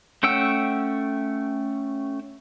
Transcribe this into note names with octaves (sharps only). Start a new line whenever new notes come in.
A3 C#4 F#5 G5 E6